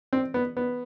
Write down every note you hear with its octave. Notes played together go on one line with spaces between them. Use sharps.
C4
B3
B3